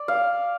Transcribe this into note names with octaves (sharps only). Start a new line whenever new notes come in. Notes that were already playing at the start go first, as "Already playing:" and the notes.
Already playing: D5
F5